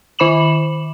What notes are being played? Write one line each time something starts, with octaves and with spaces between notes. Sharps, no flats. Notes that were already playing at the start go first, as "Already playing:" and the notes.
D#3 C5 B5 D6 E7 F#7